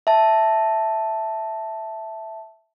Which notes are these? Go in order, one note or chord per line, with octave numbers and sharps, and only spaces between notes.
E5 A5